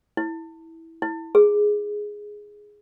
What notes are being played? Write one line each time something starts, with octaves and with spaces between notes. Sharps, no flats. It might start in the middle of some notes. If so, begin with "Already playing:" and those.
E4
E4
G#4